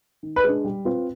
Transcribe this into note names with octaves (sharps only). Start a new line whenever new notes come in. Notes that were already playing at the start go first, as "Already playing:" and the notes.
D#3
B4
G#3 D4
G3
C4 F4 B4